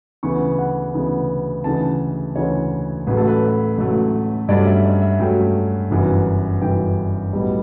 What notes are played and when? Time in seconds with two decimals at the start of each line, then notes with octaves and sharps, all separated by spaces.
0.23 D2 C#3 E3 B3 C#6
0.58 F#5
0.93 D2 C#3 E3 B3
1.64 D2 C#3 E3 A5
2.36 D2 C#3 E3 C#5
3.07 A1 A2 F#3 A3 B4
3.17 A4
3.27 B4
3.78 A1 A2 F#3 A3
4.49 G2 F#3 A3 C#4 D5
4.67 E5
4.84 D5
5.02 E5
5.20 G2 F#3 A3 C#4 G5
5.91 G1 F#2 E3
6.62 G1 F#2 E3 G5
7.33 B1 A2 G3 B3